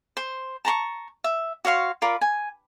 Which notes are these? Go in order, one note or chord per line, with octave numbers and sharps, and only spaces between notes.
C5
A5 A#5 C6 C#6
E5
F#4 C#5 F5 C6
F4 A#4 D5 B5
G#5